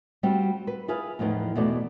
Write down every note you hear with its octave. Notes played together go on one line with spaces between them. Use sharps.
G3 C4 F4 F#4
B4
E4 F4 G#4 B4 F5
E2 A2 F3 B3 D#4
E2 B2 A3 D5